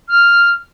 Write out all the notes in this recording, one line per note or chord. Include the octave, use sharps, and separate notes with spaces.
F6